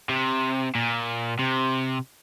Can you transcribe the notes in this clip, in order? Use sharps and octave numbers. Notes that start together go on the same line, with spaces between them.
C3
A#2
C3